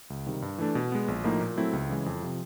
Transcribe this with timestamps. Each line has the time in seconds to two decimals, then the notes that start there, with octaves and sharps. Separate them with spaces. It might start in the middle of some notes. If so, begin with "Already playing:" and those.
0.10 C#2
0.26 C3 D#3 G3
0.42 G2
0.58 E3 A3 D4
0.75 B2
0.92 G#3 B3
1.08 A#1
1.24 A2 F3 A#3 D#4
1.41 A#2
1.57 F#3 A3 C4 E4
1.73 C#2
1.90 C#3 E3 G#3
2.06 F2
2.22 C3 F3